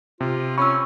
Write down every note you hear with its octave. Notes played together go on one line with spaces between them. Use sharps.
C3 F4
C#4 B5 C#6 E6